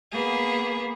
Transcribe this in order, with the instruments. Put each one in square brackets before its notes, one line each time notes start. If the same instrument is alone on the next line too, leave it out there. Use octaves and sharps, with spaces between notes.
[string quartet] A#3 B3 [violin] G#4